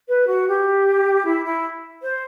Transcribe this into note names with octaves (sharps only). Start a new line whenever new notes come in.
B4
F#4
G4
E4
E4
C5